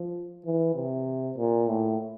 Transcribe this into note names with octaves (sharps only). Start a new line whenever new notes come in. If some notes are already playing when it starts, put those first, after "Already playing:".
Already playing: F3
E3
C3
A#2
A2